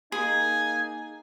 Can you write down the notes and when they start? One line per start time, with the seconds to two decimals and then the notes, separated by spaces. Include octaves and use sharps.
0.12 A#3 D#4 G#4 G#5